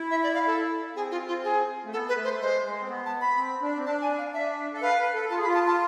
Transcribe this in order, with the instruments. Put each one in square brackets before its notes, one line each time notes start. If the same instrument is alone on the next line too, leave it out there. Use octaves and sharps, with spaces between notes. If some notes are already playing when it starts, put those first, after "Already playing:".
Already playing: [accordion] E4
[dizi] E5
D5
F5
A4
[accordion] C4 [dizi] G#4
[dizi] F4
F4
G#4
[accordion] A3
[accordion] B3 [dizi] A4
[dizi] B4
[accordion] A3
[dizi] C5
[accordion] G#3 [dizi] C5
[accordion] G#3
C4
B3
[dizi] A5
B5
[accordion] C4
D4
C4
[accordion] D4 [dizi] A5
[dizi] G#5
F5
[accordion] D4 [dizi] E5
[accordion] A4
[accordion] B4 [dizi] F5
[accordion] B4
A4
[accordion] F4 [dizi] A5
[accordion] G#4
[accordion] F4 [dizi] B5
[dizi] A5
A5